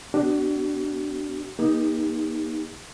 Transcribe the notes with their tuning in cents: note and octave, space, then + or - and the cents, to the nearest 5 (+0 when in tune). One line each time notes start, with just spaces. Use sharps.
B3 +15 D4 +0 F#4 +40
A#3 +40 D#4 +10 G4 +45